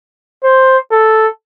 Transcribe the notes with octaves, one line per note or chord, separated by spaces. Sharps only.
C5
A4